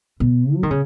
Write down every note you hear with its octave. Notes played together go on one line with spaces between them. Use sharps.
B2
F#3
D#3
C#3